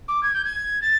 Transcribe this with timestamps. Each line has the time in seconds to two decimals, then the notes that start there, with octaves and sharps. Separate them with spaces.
0.08 D6
0.23 G#6
0.34 G6
0.45 G#6
0.82 A6